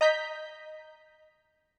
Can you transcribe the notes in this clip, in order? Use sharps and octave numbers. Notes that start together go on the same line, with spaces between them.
D#5 A#5 G6 B6